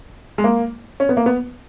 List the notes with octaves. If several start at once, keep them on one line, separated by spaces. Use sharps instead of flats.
G#3
A#3
C#4
B3
A#3
B3